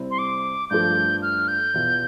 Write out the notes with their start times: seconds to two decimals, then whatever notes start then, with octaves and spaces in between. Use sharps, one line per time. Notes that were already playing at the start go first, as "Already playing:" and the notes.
Already playing: C3 G3 C4 E4
0.11 C6
0.18 D6
0.70 G2 F3 A3 G6
1.22 F6
1.48 G6
1.74 E2 B2 B3 F4